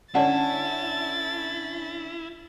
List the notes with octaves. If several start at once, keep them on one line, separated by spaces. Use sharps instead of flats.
D3 C#4 E4 C#5 D5 F#5 A5 A6